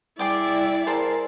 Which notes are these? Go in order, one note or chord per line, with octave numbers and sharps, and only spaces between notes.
G3 E4 G#4 D5 G5 D6
G#4 A#4 C5 A5